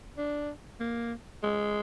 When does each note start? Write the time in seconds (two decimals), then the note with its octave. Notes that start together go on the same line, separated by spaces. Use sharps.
0.17 D4
0.80 A#3
1.43 G#3